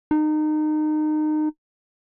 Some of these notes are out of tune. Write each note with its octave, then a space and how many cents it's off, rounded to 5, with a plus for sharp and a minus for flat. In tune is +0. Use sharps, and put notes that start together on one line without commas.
D#4 -25